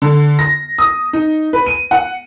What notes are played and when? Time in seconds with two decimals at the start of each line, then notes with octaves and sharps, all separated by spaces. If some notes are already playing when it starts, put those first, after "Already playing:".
0.02 D3
0.39 A#6
0.79 D#6
1.13 D#4
1.53 B4
1.66 D#7
1.91 F#5